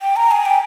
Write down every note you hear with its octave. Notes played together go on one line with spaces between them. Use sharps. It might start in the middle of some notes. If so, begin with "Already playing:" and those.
G5
A#5
G#5
G5